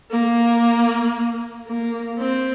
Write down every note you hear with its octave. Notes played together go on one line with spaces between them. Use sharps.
A#3
A#3
C4